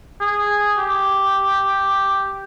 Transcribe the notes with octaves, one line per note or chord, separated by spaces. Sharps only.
G#4
G4